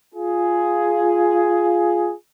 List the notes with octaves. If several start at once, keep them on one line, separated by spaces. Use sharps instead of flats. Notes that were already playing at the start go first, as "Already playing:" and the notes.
F4 G#4